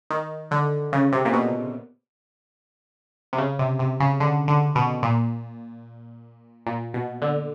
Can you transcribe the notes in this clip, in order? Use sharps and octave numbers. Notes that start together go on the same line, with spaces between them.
D#3
D3
C#3
C3
A#2
B2
C3
C#3
C3
C3
C#3
D3
D3
B2
A#2
A#2
B2
D3